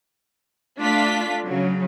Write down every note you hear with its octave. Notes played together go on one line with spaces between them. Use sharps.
A3 D4 F4 B6
C#3 F#3